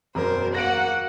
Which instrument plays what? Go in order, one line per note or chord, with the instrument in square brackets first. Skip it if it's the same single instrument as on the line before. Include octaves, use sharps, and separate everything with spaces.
[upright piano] E1 F#2 [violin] A#4 C5
[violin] A#3 F#4 [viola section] F#5 [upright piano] A#6 D7